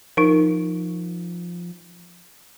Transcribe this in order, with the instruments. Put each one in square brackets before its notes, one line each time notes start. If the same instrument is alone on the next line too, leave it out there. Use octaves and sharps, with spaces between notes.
[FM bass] F3 [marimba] D#4 A#4